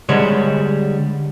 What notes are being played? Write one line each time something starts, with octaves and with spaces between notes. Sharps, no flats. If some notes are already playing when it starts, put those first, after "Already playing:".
D3 G3 G#3 C5 C#5